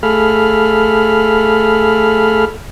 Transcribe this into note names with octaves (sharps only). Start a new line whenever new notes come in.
A3 G#4 A4 F5 B5 F6